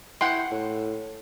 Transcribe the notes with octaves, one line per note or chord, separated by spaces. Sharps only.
E4 F#5 G5 C6
A2